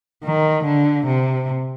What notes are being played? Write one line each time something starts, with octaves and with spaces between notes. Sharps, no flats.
D#3
D3
C3